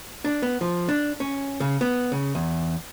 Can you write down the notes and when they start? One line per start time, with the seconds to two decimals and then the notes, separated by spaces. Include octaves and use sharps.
0.25 D4
0.42 B3
0.61 F3
0.89 D4
1.20 C#4
1.60 C#3
1.81 B3
2.12 C#3
2.35 E2